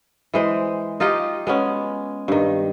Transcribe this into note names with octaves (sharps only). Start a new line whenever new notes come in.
E3 G#3 C5
D#4 F4 G4 D#5
G#3 B3 C#4
G2 D#3